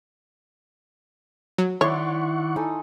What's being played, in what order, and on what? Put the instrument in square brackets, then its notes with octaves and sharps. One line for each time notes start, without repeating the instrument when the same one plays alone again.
[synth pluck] F#3
[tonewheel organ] D#3 F#5 C#6 [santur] E4 D5 C6 [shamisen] C#5
[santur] D#4 A4 G#5